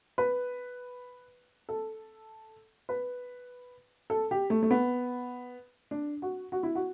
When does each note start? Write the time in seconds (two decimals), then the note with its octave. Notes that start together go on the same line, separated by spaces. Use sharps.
0.18 B4
1.69 A4
2.89 B4
4.10 A4
4.31 G4
4.50 A3
4.63 A3
4.71 B3
5.91 D4
6.22 F#4
6.52 F#4
6.63 E4
6.75 F#4